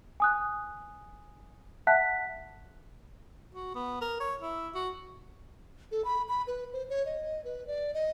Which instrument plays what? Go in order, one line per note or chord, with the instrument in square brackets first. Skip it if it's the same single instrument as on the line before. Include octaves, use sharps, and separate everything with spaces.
[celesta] G#5 D#6 F#6
E5 F#5 A5 F#6 B6
[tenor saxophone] F#4
B3
A#4
C#5
E4
F#4
[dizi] A4
B5
B5
B4
C5
C#5
D#5
B4
D5
D#5